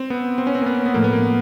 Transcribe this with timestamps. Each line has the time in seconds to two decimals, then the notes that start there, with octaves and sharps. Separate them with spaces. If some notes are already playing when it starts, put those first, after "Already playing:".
Already playing: C4
0.10 B3
0.38 C4
0.47 C#4
0.55 C4
0.61 A#3
0.66 B3
0.86 B3
0.94 A2 F3 A3 A#3
1.04 B3
1.13 A#3